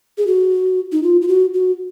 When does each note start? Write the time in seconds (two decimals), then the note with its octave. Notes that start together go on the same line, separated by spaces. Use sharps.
0.18 G#4
0.27 F#4
0.92 D#4
1.03 F4
1.21 F4
1.28 F#4
1.54 F#4